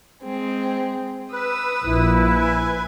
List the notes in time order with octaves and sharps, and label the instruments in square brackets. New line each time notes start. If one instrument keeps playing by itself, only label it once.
[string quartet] G#3 C4 G#4
[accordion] B4 [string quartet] D#6 E6
[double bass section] A#1 [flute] E4
[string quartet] G#5